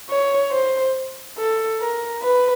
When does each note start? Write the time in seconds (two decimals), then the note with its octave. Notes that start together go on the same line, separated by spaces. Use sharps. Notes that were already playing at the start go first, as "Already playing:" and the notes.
0.10 C#5
0.52 C5
1.38 A4
1.80 A#4
2.22 B4